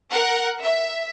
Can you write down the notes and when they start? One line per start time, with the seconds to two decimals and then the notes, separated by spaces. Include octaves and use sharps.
0.10 A#4 F#5
0.63 E5